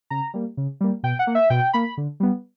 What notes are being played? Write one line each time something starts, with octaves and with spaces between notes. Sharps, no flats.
C#3 A#5
G3 A#3
C#3
G3 A#3
B2 G5
F#5
A#3
E5
B2 G5
A#3 B5
D3
G3 B3